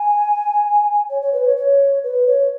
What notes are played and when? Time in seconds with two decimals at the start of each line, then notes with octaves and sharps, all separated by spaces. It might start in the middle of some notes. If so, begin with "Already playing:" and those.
Already playing: G#5
1.10 C#5
1.22 C#5
1.33 B4
1.45 C#5
1.57 C#5
2.04 B4
2.27 C#5